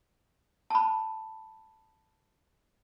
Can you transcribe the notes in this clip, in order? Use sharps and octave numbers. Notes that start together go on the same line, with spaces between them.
A5 B5